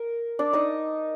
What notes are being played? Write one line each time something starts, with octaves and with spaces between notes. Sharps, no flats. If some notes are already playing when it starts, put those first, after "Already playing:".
Already playing: A#4
D4 D5
D#4 D#5